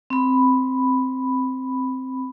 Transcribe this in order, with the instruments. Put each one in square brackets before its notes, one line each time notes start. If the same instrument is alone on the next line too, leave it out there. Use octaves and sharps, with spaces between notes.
[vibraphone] C4 B5